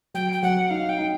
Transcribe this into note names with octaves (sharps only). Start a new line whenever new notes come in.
F#3 G5
G5
F#3 F#5
D#4 F5
G5
D#4